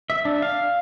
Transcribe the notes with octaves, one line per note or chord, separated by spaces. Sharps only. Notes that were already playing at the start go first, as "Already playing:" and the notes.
E5
D4
F5